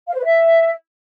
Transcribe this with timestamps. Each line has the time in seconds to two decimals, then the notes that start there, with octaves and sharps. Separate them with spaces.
0.09 F5
0.14 C5
0.19 B4
0.24 E5